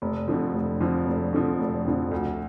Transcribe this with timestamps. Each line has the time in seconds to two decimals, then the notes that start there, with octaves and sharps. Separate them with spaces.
0.02 F1
0.28 F2 D3 F3
0.54 F1
0.80 F2 D3 F3
1.06 F1
1.33 F2 D3 F3
1.59 F1
1.85 F2 D3 F3
2.11 D2